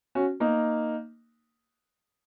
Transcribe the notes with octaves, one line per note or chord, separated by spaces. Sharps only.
C#4 F#4
A#3 D#4